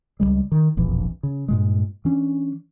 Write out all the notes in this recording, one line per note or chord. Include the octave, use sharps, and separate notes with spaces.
C#2 G#2 G3 G#3
D#3
E1 A#1 F2 E3
C#3
G2 A#2 G#3
E3 C#4 D4